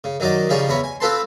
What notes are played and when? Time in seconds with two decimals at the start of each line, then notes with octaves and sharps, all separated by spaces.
0.04 C#3
0.20 D#3 F#3 D#4 D5 D#5
0.49 C#3 F3 G3 D#4 G#4 C#5
0.69 E2 C#4 A#5 B5 C#6
0.84 G#5
1.00 C4 F4 A4 B4 A5 C6